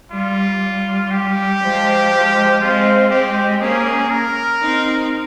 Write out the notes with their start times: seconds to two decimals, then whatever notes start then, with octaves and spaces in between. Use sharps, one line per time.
0.10 G3 F4
0.60 G3
1.11 G4
1.61 F3 G#3
2.11 F3 G#3
2.61 G#3 C4 F4
3.10 G#3 C4 G4
3.60 A#3 C#4 G#4
4.11 A#4
4.61 C4 D#4